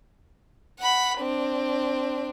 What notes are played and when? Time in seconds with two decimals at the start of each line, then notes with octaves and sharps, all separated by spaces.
0.80 F#5 B5
1.19 C4 D4